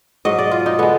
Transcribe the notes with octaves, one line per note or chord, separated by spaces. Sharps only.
G#2 F#3 D#5
D5
F4
D#4
D3 G#3 B3